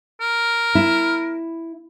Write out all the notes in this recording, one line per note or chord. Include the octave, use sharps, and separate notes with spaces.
A#4
E4